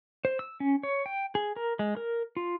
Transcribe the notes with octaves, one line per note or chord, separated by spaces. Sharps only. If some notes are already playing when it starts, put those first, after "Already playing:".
C5
E6
C#4
C#5
G5
G#4
A#4
G#3
A#4
F4